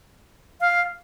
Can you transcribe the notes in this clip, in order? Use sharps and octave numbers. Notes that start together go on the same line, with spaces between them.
F5